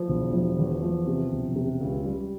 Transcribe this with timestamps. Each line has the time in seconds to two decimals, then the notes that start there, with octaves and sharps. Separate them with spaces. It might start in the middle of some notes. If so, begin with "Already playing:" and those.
Already playing: F3
0.08 E1
0.33 F3
0.58 E2
0.83 F3
1.07 C3
1.31 E1
1.56 C3
1.81 C#2
2.05 G3